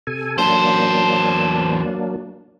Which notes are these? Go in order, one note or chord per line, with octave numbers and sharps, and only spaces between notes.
C3 A4 G#5
E2 F#3 A#3 D4 C5 A5